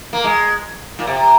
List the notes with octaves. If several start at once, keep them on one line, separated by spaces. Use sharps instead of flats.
A#3
G#3
A#2
C3